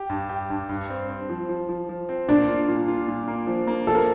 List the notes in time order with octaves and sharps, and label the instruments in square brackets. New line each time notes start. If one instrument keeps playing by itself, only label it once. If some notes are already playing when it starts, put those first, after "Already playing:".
Already playing: [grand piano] G4
G2
G4
G2
G2
C4
C4
F3
F3
F3
F3
C4
[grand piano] A#3 [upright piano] D4
[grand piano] F4
A#2
F4
A#2
A#3
F3
A#3
[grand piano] F3 [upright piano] A4
[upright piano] A#4